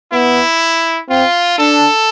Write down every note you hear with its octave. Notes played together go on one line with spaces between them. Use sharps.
B3 E4
C4 F4
D4 A4